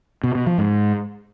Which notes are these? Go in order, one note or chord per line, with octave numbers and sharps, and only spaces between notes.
B2
B2
F3
G#2